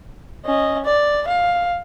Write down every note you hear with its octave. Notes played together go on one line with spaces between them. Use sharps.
C#4 D#5
D5
F5